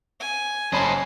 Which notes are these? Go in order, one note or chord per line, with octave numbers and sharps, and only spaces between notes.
G#5
F#1 C5 C#5 D#5 G#5 A5 B5 C7